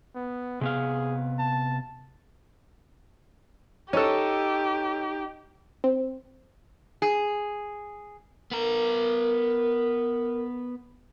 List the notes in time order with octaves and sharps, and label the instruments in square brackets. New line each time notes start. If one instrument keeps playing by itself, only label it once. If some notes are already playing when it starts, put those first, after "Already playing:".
[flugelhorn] B3
[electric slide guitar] C3 B3 F5 [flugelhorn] G#4
[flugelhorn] A5
[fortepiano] C#4 A4 [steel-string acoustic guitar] D#4 [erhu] G4
[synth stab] C4
[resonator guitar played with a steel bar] G#4
[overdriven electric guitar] B3 A#5 [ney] A#4